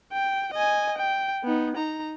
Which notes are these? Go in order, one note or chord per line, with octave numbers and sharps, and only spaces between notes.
G5
D#5 G#5
G5
B3 D#4
D#4 A#5